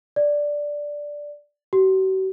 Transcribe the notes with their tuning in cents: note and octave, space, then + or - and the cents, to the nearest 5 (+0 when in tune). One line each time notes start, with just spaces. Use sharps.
D5 -5
F#4 +45